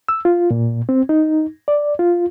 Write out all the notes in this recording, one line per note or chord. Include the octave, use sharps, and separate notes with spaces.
E6
F4
A#2
C4
D#4
D5
F4